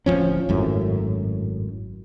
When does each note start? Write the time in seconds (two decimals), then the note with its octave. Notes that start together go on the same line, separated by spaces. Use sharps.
0.06 D1 E2 F3 C#4
0.49 G#1 F#2 A2